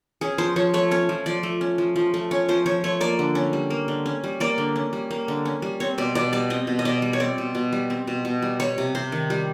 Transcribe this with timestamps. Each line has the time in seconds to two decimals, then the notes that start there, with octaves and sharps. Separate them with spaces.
0.21 C#4 G#4
0.38 F3 C5
0.56 F3 C#5
0.74 A3 C#5
0.91 C#4 C#5
1.09 F3
1.26 F3 D5
1.43 A3
1.61 C#4
1.78 F3
1.96 F3
2.14 A3
2.31 C#4 C#5
2.48 F3 C5
2.66 F3 C#5
2.84 A3 C#5
3.01 A#3 D5
3.19 D3
3.35 C#4
3.53 G3
3.70 A#3
3.88 D3
4.06 C#4
4.24 G3
4.40 A#3 D5
4.58 D3
4.76 C#4
4.93 G3
5.11 A#3
5.28 D3
5.45 C#4
5.62 G3
5.80 C4 C#5
5.98 B2 D5
6.15 B2 D5
6.33 G3 D5
6.50 C4 D#5
6.67 B2
6.79 D#5
6.85 B2 D5
7.02 G3
7.13 C#5
7.20 C4 D5
7.38 B2
7.55 B2
7.72 G3
7.90 C4
8.07 B2
8.25 B2
8.42 G3
8.60 G3 C#5
8.78 C3
8.95 C3 C5
9.12 D#3
9.30 G3